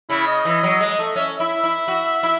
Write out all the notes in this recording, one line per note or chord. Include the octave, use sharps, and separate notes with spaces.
C#3 E4
D#5
E3
F#3
G#3
A3
C#4 E5
E4 E5
E4
F#4
E4